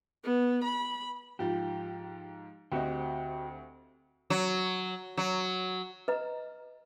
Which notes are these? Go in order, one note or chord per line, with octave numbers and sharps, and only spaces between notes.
B3
B5
G#2 F3 G4
D2 C4 F#4 G4 D#5 G5
F#3
F#3
B4 D#5 A#5